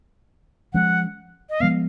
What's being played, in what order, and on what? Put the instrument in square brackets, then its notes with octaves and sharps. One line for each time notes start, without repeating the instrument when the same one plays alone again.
[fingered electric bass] F3 G#3 C#4 [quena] F#5
[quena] D#5
[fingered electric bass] F3 G#3 B3 [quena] F5